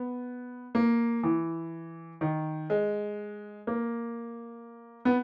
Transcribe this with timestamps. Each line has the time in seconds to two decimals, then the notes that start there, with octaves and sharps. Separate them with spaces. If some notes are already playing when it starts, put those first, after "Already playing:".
Already playing: B3
0.75 A#3
1.23 E3
2.21 D#3
2.70 G#3
3.67 A#3
5.05 B3